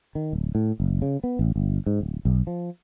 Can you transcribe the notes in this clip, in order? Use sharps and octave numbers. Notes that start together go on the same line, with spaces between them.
D#3
D1
A2
F#1
C#3
B3
A1
G1
G#2
D1
B1
F3